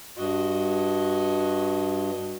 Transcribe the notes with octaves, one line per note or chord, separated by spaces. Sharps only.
G2 F#4 D#5